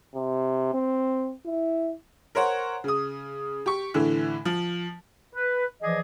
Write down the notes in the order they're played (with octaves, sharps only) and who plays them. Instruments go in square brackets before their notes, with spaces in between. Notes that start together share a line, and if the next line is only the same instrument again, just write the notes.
[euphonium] C3
C4
E4
[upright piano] A#4 C5 C#5 F#5
C#3 D#6
G4 C#6
A2 D3 E3
F3
[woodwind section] B4
E3 F3 G#4 D5 D#5